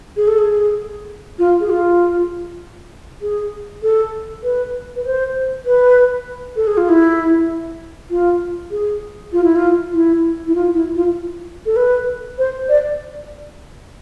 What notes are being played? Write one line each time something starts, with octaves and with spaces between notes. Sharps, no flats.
G#4
A4
G#4
F4
G#4
F4
G#4
A4
B4
B4
C5
B4
A4
G#4
F4
E4
F4
G#4
F4
E4
F4
E4
E4
F4
E4
F4
A4
B4
C5
D5